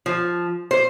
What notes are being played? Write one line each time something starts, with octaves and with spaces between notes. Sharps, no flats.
F3
C5